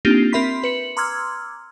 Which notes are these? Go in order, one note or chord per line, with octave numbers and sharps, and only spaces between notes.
A#3 C4 D4 D#4 F4 G4
C4 A#4 E5 B5 C6 B6
B4 C#7 F#7
A#5 C6 D6 E6 F6 G#6